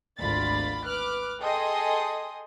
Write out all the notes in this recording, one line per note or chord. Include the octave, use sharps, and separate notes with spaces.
G#1 D2 F4 D5 B5 A6
B4 D6 F6 F#6
G#4 A4 D#5 G5 C6 D#6